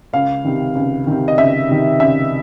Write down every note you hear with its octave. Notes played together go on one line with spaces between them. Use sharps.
C#2 F5
C3 D#3
C#2
C3 D#3
D#5
C#2 E5
C3 D#3
C#2 E5